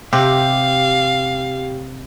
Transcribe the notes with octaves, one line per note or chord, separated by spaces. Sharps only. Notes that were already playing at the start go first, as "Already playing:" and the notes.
C3 G4 F5